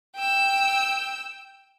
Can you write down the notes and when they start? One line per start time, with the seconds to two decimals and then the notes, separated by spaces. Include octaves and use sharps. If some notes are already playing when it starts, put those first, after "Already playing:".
0.16 G5 E6